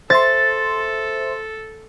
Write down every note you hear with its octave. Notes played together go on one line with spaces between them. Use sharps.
A4 C5 E5 C6 A6